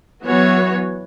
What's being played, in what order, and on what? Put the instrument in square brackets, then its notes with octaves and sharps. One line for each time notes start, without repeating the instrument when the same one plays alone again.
[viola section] E3 B3 F#4 C#5 [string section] F#3